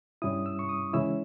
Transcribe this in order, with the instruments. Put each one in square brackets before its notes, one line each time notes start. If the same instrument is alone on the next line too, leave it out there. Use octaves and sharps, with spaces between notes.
[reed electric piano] G2 G3 C#4 E4 D#6
E6
C#6
D#6
C#3 E3 G#3 C#4 E4 E6